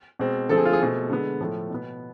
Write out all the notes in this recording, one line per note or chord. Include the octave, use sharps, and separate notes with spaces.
B2 G#3 C4
D3 F3 A3 C4 A4
G#4
F4
G#4
B2 A3 C4
D3 G#3 B3
A2 F3 A3
B2 B3